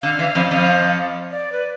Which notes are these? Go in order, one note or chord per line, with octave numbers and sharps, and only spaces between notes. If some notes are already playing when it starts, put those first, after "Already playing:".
D3 F5
E3
F2 F3
F2 F3
D5
B4